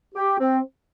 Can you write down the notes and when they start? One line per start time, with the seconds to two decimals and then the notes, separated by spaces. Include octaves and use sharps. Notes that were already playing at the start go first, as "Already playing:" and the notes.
0.15 G4
0.39 C4